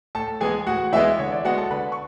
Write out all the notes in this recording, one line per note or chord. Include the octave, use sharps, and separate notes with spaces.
A2 A4 A5
E3 G#3 B3 G#4 G#5
A2 F#4 F#5
E3 G#3 B3 E4 E5
D3 C#5
D5
G#3 B3 F#4 F#5
A4 A5
D3 B4 B5
C#6